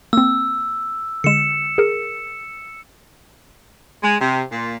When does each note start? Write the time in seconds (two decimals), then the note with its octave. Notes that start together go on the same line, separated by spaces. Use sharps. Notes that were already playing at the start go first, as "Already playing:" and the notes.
0.13 A#3 C4 E6
1.24 D3 G#3 C#7 E7
1.78 G#4 A#4
4.04 G#3
4.21 C3
4.52 A#2